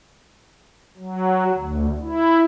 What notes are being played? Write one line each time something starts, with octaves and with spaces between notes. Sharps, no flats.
F#3
D2
E4